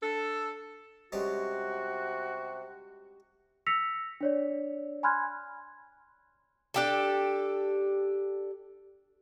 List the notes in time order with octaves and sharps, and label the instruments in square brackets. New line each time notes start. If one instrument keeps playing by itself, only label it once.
[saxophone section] D4 A4
[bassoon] C3 [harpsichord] G3 G#3 C#4 [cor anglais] F#4
[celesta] E6 A#6 B6 C#7 F7
D4 C#5 D5
G#5 B5 C6 F6 F#6 G#6
[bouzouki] D4 G4 A4